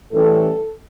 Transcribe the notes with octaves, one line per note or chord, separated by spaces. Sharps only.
A2 E3 G3 C#4 A4